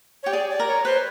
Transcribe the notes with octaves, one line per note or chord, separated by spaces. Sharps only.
G4 C#5
G#4 D5
D5
A#4
C#5
B4 C5